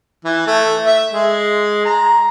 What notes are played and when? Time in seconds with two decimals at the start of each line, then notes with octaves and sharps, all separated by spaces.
0.25 E3
0.47 A3
0.85 E5
1.13 G#3
1.85 A#5